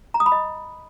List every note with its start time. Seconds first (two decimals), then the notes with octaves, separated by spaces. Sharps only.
0.14 A#5
0.20 D#6
0.26 B5
0.32 D#5